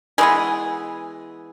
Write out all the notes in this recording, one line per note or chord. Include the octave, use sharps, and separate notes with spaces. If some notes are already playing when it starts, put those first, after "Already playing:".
E3 G#3 B3 G#4